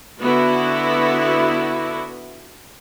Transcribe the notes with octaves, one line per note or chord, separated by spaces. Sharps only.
D3 B3 E4 F#4